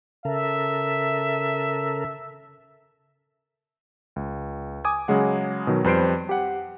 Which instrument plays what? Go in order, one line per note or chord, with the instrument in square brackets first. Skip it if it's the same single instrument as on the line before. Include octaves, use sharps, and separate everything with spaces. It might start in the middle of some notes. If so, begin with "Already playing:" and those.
[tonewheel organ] C#3 A4 A#4 [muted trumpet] E5
[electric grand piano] C#2
G#5 D6 D#6 G#6
C#3 F#3 G#3 F#5
B2 D#3 F#3
F2 G3 B4 C5 C7 D7
G4 F#5